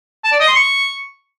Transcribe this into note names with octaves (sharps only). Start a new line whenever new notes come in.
A5
D5
D#5
C6
C#6